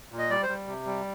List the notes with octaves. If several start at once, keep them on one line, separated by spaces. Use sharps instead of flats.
A#2
D#5
G3 D5
C5
G3
C3
G3